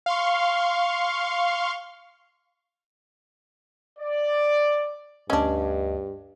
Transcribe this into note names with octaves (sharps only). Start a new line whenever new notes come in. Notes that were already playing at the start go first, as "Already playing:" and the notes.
F5 C6 C#6
D5
D2 G2 C#4 D4 D#5